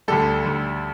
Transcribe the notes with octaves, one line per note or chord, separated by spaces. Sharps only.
D2 D3 G3 A4
D2 D3 G3